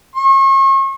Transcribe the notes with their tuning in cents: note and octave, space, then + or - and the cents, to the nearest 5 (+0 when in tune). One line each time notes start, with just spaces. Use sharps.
C#6 -40